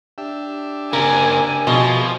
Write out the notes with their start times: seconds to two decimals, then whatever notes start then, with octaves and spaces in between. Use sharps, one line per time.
0.18 D4 G4 E5
0.93 C#3 A#3 A#4 G#5
1.67 B2 F3 G#4